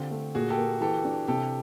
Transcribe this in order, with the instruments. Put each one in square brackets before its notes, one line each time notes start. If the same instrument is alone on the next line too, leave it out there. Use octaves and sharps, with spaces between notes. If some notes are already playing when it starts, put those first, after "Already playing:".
Already playing: [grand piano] D3 C4 [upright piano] F4 G4
[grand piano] A3
[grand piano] A#2 [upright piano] F#4 G#4
[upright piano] G4 A4
[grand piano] A#3
[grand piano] E3 [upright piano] G4 A4
[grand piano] D4
[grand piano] C3 [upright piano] G4 A4